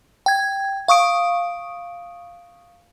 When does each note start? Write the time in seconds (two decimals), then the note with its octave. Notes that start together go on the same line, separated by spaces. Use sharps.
0.26 G5 G#6
0.88 F5 C#6 D#6 D7